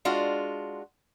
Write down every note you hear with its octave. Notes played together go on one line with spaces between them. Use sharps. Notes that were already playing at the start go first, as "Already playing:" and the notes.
G#3 D4 F4 F#4